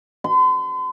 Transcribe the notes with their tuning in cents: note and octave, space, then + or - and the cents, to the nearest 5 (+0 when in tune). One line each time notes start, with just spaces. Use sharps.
C6 -45